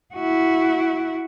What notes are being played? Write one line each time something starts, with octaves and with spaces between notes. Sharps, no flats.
E4 F#4